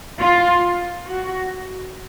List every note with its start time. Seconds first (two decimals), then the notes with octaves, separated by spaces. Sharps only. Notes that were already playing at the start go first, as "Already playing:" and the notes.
0.20 F4
1.06 F#4